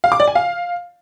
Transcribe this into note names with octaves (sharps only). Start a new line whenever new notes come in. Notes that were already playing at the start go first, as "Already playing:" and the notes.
F5
D6
D5
G#5
F5